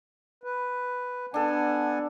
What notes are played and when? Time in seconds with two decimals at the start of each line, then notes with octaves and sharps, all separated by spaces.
0.43 B4
1.34 B3 D4 A4 F#5 G#5